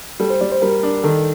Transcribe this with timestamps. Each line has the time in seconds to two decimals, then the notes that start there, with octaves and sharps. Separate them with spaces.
0.20 G3 A4
0.30 C5
0.41 G3 D5
0.52 C5
0.62 G3 A#4
0.83 D4
1.04 D#3 A4